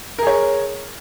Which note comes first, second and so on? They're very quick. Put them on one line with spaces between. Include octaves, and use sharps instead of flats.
A#4 G#4 C#5